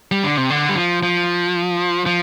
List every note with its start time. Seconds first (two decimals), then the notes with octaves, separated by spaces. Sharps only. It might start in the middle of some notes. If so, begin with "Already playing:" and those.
0.12 G3
0.24 D3
0.37 C3
0.50 D3
0.69 G3
0.76 F3
1.03 F3
2.06 F3